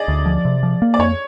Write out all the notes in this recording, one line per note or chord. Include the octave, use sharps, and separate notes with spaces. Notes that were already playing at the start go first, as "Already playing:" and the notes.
Already playing: G#4 D5 D#5
D2
F3
C3
F3
A#3
D5
F2 C#5